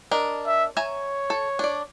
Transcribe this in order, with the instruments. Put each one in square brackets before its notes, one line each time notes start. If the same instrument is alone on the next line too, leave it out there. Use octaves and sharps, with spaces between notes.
[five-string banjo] D4 A#4 D#5
[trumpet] E5
[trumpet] C#5 [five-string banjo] E5 G#5 A#5
[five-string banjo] A4
D4 D5